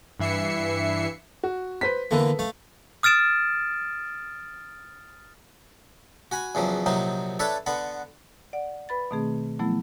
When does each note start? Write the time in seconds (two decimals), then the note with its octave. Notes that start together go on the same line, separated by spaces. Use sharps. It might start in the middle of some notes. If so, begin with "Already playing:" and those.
0.19 G2 E3 E5 C7 C#7
1.43 F#4
1.81 B4 C5 B6
2.11 D3 E3 A#3 B3 A4 B4
2.39 A3 F5
3.03 D#6 F6 A6 D7 E7
6.31 F#4 G#5 B5
6.55 E2 C#3 F3 F#3
6.86 A#1 C3 F#3 D#4
7.39 D4 A4 B4 C#5 E5
7.66 D3 B3 F#5 B5
8.53 D5 F#5
8.89 B4 B5 A6
9.11 B2 D#3 A3 C4 G#4
9.59 F3 F#3 A3 B3 E4